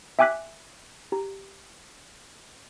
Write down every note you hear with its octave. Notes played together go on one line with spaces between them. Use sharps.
E5 G5 G#5 D6 F#6 B6
G4 A#5